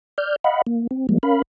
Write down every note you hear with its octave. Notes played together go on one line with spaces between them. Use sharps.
D5 F6 G6
D#5 F5 F#5 B5
A#3
C4
F3 G3 G#3 A#3
C#4 A#4 F5 B5